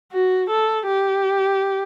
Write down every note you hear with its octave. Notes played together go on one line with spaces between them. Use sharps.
F#4
A4
G4